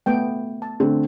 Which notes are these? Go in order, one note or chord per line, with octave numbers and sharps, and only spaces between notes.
A3 B3 G5
A5
D3 A3 C4